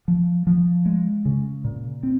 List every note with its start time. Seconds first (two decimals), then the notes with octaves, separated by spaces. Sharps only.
0.08 F3
0.47 F3
0.86 G#3
1.25 C#3
1.64 A#2
2.03 C4